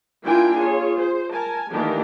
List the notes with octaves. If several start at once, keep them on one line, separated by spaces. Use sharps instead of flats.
A#3 D4 E4 F4 G5 G#5
F4 G#4 C#5
C5
A#4 G#5 A5
D#3 E3 A3 A#3 D4 G4